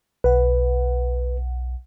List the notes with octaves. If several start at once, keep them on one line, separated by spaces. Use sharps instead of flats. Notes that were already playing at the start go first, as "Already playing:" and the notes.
B1 B4 F#5